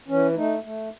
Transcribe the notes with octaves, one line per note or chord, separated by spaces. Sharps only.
E3 C#4
A3 D#4
A3